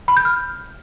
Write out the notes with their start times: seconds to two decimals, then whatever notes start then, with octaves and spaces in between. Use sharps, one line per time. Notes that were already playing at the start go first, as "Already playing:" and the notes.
0.08 B5
0.17 G6
0.25 F6